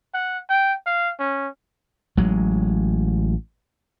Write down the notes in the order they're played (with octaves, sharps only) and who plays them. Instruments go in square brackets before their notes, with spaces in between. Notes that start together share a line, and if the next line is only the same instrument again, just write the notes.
[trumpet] F#5
G5
F5
C#4
[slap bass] A1 F#3 G#3